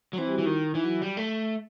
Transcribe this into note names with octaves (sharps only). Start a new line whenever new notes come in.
F#3
E3 C4 C5
G3 F#4 G4
E3 E4
D#3 D#4
E3 E4
F#3 F#4
G3
A3